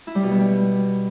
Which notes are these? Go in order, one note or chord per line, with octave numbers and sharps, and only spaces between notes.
E4
G3
B2
B3
G3